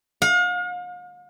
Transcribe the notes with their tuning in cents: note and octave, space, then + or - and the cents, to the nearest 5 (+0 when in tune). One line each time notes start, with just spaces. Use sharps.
F5 +40